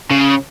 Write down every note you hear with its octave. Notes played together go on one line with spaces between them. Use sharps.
C#3